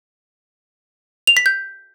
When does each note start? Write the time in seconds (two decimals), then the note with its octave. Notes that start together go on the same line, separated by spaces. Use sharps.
1.27 F7
1.37 B6
1.46 G6